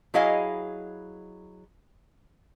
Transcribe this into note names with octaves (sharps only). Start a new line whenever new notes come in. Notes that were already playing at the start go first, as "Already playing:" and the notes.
F#3 E4 G#4 D#5 F5 G#5